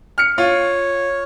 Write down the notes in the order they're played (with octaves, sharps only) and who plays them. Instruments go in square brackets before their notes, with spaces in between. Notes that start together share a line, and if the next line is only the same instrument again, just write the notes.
[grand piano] F6 C#7
[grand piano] F4 [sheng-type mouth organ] C#5